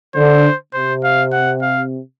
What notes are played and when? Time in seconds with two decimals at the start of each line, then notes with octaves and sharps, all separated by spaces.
0.15 D3 C5
0.73 C3 C5
1.04 F5
1.32 F#5
1.62 F5